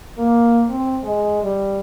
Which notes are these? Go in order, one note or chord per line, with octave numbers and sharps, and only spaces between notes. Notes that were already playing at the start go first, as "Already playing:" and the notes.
A#3
C4
G#3
G3